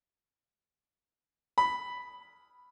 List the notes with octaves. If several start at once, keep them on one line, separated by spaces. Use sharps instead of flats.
B5